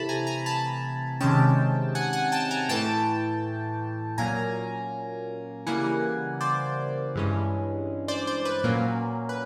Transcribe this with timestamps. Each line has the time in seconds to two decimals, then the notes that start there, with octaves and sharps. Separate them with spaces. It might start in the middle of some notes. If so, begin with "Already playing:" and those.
Already playing: C3 E3 A3 A5 B5
0.09 G#5 A#5
0.27 G#5 A#5
0.46 A5 B5
1.20 C3 D#3 G#3 C#4 G5 A5
1.95 F#5 G#5
2.13 F#5 G#5
2.32 G5 A5
2.51 G#5 A#5
2.69 A2 E3 A3 G5 A5
4.18 A#2 F#3 A#3 C#4 G#5 A#5
5.66 C#3 E3 G3 A#3 F#5 G#5
6.41 C5 D5
7.15 G2 E3 G#3 C#4
8.08 C5 D5
8.27 C5
8.45 B4
8.64 A#2 F#3 A#3 C#4
9.29 B4